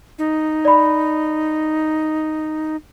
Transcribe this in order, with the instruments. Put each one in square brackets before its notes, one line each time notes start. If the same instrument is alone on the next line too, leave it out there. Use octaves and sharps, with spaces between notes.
[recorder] D#4
[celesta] D5 B5